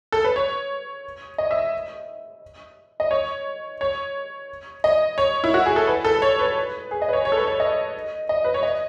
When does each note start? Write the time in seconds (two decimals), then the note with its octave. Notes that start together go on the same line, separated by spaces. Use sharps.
0.12 A4
0.24 B4
0.36 C#5
1.38 D#5
1.51 E5
3.00 D#5
3.11 C#5
3.81 C#5
4.84 D#5
5.18 C#5
5.44 E4
5.54 F#4
5.66 G#4
5.76 A4
5.87 B4
6.05 A4
6.22 C#5
6.39 B4
6.91 G#4
7.02 D#5
7.09 B4
7.13 C#5
7.25 C#5
7.32 A4
7.37 B4
7.48 C#5
7.60 D#5
8.29 D#5
8.44 B4
8.54 C#5
8.63 D#5